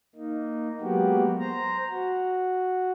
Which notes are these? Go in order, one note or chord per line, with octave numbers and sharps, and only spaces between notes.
A#3 D#4
F#3 G#3 A#3 B3 F#4 G4
C5 A#5
F#4